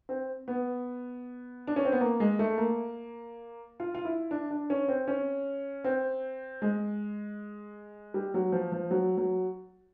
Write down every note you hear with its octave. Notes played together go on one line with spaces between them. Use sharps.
C4
B3
D4
C#4
C4
B3
A#3
G#3
A3
A#3
F4
F4
E4
D4
D4
C#4
C4
C#4
C4
G#3
G3
F#3
F3
F3
F#3
F#3